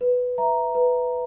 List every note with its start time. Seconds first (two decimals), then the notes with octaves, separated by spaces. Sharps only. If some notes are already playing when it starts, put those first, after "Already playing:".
0.01 B4
0.38 E5 A#5
0.75 B4